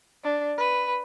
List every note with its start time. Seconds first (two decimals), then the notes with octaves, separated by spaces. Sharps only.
0.24 D4
0.58 B4